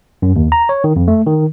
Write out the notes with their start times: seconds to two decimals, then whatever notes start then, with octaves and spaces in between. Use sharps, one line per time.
0.22 F#2
0.36 D#2
0.52 A#5
0.69 C#5
0.84 D#3
0.96 F2
1.08 A3
1.26 D#3